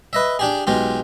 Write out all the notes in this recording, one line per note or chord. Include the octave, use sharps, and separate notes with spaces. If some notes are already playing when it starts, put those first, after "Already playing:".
B4 D#5 E5
D4 G4 G#4
B1 G#3 F4 G4